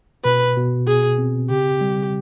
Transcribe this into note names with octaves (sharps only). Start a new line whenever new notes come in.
B2 B4
B2
B2 G#4
C4
C#3 G4
G3